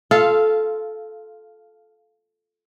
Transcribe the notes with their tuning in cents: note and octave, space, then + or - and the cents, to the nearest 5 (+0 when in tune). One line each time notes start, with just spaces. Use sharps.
F4 +0 A4 -15 F5 -15